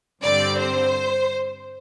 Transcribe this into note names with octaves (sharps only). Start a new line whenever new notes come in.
G2 D3 G3 C4 D5
C5